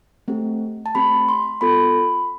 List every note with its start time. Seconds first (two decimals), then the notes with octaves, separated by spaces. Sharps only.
0.28 A3 C4 G4
0.86 A5
0.95 A3 C4 G4 B5
1.29 C6
1.61 B3 F4 A4 B5